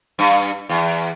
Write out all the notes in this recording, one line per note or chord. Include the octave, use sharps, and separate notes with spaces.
G2
E2